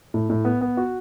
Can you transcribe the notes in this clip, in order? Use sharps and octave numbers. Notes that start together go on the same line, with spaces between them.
A2
A2
B3
B3
F#4